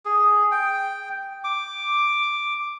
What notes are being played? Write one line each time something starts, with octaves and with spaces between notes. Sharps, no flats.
G#4
G5
D6